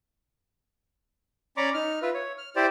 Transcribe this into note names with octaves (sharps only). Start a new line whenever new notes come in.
C#4 D5 A#5 B5 C#6 D6
D#4 F6
F4 B4 E5
C#5
F6
E4 G4 C5 D5